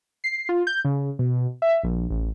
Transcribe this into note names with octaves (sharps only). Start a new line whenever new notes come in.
C7
F4
G6
C#3
B2
E5
A#1
A1